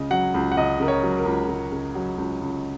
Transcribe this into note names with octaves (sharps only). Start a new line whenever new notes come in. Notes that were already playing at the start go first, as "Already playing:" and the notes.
Already playing: C#2 C#3 D#5
F#3 F#5
C#2
F#5
C#2 D#5
C#3 A#4
C#5
F#3
A#4
C#2
C#2
C#3
F#3
C#2
C#2